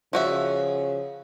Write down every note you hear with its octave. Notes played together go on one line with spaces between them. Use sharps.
C#3 F3 F#4 E5